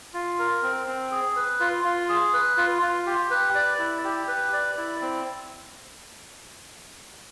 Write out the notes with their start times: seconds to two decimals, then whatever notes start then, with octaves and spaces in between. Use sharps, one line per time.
0.14 F4
0.39 A#4
0.63 C4
0.87 C4
1.11 G#4
1.36 B4
1.60 F4
1.84 F4
2.09 G#4
2.33 B4
2.57 F4
2.82 F4
3.06 G4
3.30 B4
3.55 D5
3.79 E4
4.04 G4
4.28 B4
4.53 D5
4.77 E4
5.01 C4